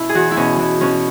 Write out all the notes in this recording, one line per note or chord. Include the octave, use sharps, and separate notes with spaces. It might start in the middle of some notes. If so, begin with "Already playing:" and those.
Already playing: B2 C#4 E4
G#4
E2 F#4
E4
B2 C#4
B2
B2 C#4